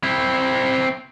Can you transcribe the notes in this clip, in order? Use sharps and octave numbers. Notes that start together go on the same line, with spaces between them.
C4 E4